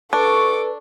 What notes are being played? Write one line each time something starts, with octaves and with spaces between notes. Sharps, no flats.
D4 A4 B4 C#6 D6